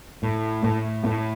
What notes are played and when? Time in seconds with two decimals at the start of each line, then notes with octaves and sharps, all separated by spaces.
0.23 A2
0.64 A2
1.05 A2